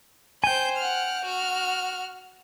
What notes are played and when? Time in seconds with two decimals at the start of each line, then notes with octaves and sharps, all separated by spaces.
0.44 C5 G5 G#5 G6
0.77 F#5 F6
1.24 F#4 F6